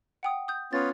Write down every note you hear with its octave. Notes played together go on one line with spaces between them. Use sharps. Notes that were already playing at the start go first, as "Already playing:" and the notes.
F#5 G5 D#6
D#6 G6
B3 C#4 F4 A6